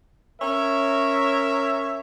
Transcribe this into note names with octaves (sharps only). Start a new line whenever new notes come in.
C#4 A#4 C#5 E5